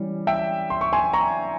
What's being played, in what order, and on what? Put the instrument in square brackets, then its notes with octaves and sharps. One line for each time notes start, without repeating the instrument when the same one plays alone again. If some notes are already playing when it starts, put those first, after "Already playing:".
Already playing: [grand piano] E3 G3 C#4
E5 G5
C6
C#6
G#5 C6
A#5 C#6